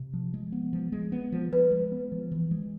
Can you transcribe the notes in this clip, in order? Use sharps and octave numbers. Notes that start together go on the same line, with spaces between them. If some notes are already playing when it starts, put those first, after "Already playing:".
Already playing: C3
F3
G#3
B3
F3
G#3
B3
F3
F3 B4
G#3
B3
F3
E3
G#3